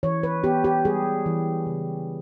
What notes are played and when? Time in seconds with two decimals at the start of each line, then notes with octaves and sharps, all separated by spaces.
0.03 E3 C#5
0.23 B4
0.44 B3 G4
0.64 G4
0.85 G3 G#4
1.26 E3
1.67 C#3